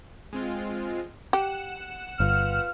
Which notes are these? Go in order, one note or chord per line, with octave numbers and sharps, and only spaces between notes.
G#3 C4 F4
G4 F#5 E7
G1 F4 B4 F6